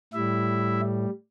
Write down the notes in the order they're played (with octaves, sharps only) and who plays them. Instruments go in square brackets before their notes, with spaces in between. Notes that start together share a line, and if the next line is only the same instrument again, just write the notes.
[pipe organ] A2 G3 E4 E5